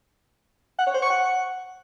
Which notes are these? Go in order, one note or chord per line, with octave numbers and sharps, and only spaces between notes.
F#5
C#5
C5
C#6
F#5